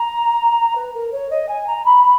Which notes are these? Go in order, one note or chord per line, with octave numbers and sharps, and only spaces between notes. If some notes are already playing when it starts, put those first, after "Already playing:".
Already playing: A#5
B4
A#4
C#5
D#5
G#5
A#5
B5
B5